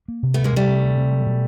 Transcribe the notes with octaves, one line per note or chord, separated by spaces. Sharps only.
A#3
C3
D2 A3 B3
G#3 A#3
C3 G3 A3
C3
D2
C3
F#3
B2